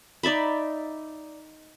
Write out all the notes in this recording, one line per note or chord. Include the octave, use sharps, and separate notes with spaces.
D#4 D5 E5 B5